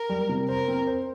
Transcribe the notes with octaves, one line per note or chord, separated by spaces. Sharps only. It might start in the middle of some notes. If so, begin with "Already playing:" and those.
Already playing: A#4
G3
C3
A#4 C5
C4
C5